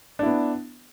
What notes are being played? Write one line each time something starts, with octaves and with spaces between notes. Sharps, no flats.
B3 D4 E4